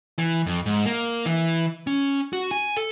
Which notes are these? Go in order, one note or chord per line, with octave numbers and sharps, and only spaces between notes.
E3
F2
G#2
A#3
E3
C#4
F#4
G#5
A4